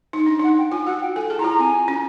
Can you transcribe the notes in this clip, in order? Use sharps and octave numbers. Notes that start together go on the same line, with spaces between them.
D#4
D4
D#4 F#5
G5
F4 G#5
F#4 F#5
G5
A4 G#5
G#4 A5
E4 A#5
F4
A#5
C4 G#5
C#4